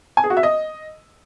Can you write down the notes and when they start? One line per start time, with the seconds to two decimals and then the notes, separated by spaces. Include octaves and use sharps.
0.17 G#5
0.24 G#4
0.30 F#4
0.37 E5
0.43 D#5